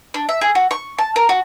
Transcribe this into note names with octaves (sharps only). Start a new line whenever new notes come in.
D4
E5
G#4
F#4
C#6
A5
A#4
F#4